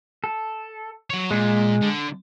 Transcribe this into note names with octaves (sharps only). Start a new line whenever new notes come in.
A4
F#3 C#5
A#2 G#3
D3